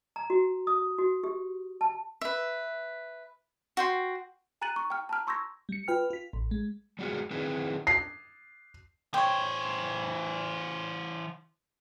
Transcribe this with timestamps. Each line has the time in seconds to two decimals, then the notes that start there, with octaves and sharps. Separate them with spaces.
0.16 A#5
0.30 F#4
0.67 D#6
0.98 F#4
1.24 G4
1.81 A5
2.21 B4 E5
3.77 F#4 G5 C6
4.62 G#5 A#5 F#6 A6 D#7 F#7
4.76 C#6
4.90 G5 F6
5.09 A5 A#5 F6
5.27 C6 C#6 E6 G6 G#6 A#6
5.69 G3 C#7
5.88 F4 B4 G5 F6
6.10 F4 B6
6.33 A1
6.51 G#3
6.99 G3 G#3 B3 F4 F#4 G#4
7.31 D#3 C4 D#4 E4 G#4 B4
7.87 C7
9.14 E3 C5 C#5 G5